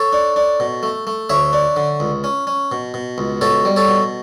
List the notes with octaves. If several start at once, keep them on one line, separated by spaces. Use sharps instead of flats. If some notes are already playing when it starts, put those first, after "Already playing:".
Already playing: A4 C#5
D4
D4
B2
A3
A3
D2 C#5 E5
D4
D3
C#2
C#4
C#4
B2
B2
C#2
B2 A4 C#5
G3
A4 C#5
B2